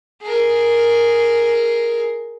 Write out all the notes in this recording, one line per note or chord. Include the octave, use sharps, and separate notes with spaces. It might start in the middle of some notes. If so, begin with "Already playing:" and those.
G#4 A#4